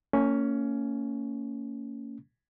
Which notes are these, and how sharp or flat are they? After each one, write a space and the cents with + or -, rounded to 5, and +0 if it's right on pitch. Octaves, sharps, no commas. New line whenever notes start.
A#3 -30 C#4 +10